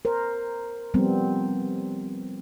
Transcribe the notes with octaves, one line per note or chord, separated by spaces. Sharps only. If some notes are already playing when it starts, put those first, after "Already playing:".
A#4 C5
F3 G3 B3 C4